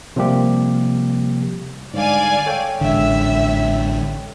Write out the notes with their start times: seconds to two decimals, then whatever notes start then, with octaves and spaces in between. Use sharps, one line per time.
0.16 C3 F3 G3 A#3 G4
1.94 G#2 D3 G3 D5 F5 G#5
2.46 A4 C#5 G5
2.81 A1 G#2 D3 E5